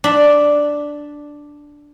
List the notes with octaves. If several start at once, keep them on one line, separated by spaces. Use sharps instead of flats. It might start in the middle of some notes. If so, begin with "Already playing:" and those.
D4 E5